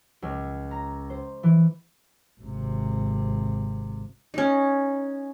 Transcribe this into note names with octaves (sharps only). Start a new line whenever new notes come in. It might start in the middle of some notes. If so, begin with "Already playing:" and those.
C#2
A#5
C5
E3
G#1 C3
C#4 D#4